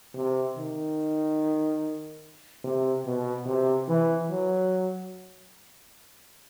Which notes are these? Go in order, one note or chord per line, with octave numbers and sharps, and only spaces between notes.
C3
D#3
C3
B2
C3
E3
F#3